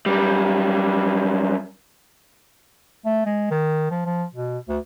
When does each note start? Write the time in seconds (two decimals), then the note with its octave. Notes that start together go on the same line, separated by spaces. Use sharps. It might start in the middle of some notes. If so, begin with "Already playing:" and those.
0.06 F#2 G3
3.05 A3
3.26 G#3
3.51 D#3
3.91 F3
4.06 F3
4.34 B2
4.68 D2